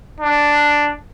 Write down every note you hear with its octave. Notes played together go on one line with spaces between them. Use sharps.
D4